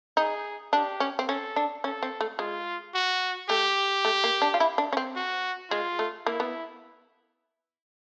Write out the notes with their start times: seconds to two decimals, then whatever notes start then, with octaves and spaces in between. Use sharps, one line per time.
0.17 D#4 G#4
0.73 D4 G4
1.00 C#4
1.19 C4
1.28 C#4 A4
1.56 D4
1.84 C#4 A4
2.03 C4
2.21 A3
2.39 G#3 F4
2.94 F#4
3.49 A3 G4
4.05 A3
4.24 A#3
4.42 D4
4.54 F4
4.60 E4
4.78 D4
4.93 C#4
4.97 C4
5.16 F#4
5.70 G#3 F4
5.99 A3
6.26 A#3 E4
6.40 B3